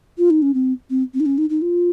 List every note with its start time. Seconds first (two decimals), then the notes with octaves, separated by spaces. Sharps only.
0.18 F4
0.30 D#4
0.42 C#4
0.54 C4
0.90 C4
1.14 C4
1.20 D#4
1.26 C#4
1.38 D#4
1.50 D#4
1.62 F4